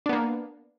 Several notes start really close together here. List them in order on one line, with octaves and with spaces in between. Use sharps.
D4 B3 A#3